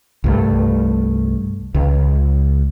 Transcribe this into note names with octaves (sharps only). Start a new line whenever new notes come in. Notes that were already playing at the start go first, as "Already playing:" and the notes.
C2 G2 A3
C#2